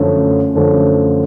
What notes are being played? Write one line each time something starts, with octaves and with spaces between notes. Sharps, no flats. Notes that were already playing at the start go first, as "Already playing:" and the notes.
Already playing: F#2 D3 F3 A3
F#2 D3 F3 A3